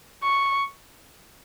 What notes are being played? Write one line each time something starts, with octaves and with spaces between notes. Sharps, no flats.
C#6